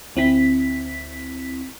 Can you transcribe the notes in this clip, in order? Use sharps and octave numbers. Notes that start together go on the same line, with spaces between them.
D2 C4 E4 B6